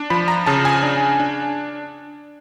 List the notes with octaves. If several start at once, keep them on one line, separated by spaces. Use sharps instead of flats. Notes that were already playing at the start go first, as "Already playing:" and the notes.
Already playing: D4
F3 B5
A#5
C#3 A5
G#5
D4
D4